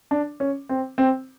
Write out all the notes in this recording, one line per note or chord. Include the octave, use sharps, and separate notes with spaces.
D4
C#4
C4
C4